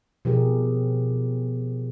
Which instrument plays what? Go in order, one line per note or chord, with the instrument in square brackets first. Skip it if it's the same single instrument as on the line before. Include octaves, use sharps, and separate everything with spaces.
[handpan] B2 F3 G4 G#4 A#4